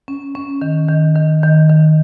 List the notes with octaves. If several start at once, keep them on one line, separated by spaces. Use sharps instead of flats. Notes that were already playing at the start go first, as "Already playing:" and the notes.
C#4
C#4
D#3
D#3
D#3
D#3
D#3